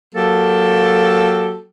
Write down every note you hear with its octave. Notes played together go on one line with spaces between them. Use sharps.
F#3 A#3 G4 A4